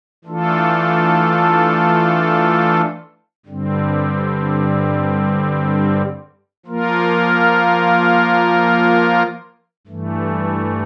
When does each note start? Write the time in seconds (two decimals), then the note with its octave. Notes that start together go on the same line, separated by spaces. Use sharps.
0.24 E3 A3 D4 F4 A4
3.46 G2 D3 G3 C4
6.66 F3 A#3 F4 A#4
9.87 G2 E3 A3